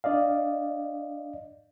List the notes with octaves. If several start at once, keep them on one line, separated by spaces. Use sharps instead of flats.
D4 D5 D#5 F5